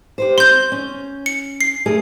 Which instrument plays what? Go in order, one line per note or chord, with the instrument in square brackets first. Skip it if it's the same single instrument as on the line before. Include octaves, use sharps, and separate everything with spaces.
[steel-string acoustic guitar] G4 B4 C5
[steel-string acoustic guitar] C4 [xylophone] C6 G6
[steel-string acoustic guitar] C#4
[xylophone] C#7
C7
[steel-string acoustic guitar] A3 G#4 A#4